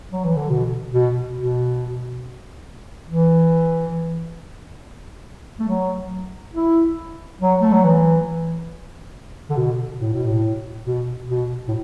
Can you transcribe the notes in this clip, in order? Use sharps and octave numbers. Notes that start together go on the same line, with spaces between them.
F#3
E3
D3
B2
B2
B2
E3
A3
F#3
E4
F#3
A3
F#3
E3
D3
B2
A2
B2
A2
B2
B2
A2